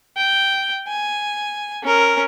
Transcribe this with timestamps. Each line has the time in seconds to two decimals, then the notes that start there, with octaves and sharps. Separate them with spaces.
0.16 G5
0.87 G#5
1.83 C#4 A#4